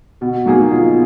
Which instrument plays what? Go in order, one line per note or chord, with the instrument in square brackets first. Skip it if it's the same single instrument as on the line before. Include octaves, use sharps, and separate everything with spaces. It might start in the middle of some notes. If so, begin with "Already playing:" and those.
[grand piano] B2 [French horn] F#4
[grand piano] F#3 A#3 D#4 G#4
[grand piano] B2 [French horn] F4